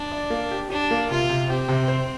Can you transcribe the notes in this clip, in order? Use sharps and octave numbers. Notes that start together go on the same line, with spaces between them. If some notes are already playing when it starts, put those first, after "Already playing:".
Already playing: D4
D5
A#3
G4
D4 G4
A#3
C3 F4
C3
C4 G4
C3
C5